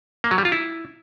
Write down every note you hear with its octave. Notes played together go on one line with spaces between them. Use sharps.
A#3
F#3
G3
F4
E4